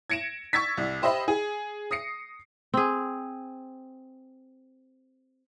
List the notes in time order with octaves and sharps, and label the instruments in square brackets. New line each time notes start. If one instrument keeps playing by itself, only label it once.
[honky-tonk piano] G#6 A#6 C#7 D7 E7
C#6 E6 G#6 A6 B6
C2
G4 C5 D#5 E5 B5
G#4
D#6 A#6 C7 C#7
[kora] C4 G#4